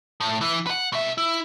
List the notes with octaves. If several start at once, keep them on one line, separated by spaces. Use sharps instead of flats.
A2
E3 E4
B4 F#5
B2 E5
E4